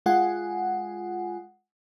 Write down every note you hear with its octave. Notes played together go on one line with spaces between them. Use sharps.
G#3 F4 F#5 G#5